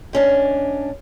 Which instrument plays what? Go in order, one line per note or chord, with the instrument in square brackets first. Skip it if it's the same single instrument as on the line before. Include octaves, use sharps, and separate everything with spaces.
[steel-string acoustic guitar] G#2 C#4 D4